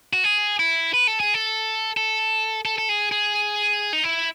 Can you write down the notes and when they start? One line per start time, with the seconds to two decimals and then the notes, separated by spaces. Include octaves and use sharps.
0.13 F#4
0.24 G#4
0.59 E4
0.94 B4
1.07 A4
1.20 G#4
1.34 A4
1.97 A4
2.65 A4
2.78 A4
2.89 G#4
3.12 G#4
3.93 D#4
4.04 E4